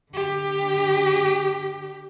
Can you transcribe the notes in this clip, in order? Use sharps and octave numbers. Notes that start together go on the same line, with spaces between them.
D3 G4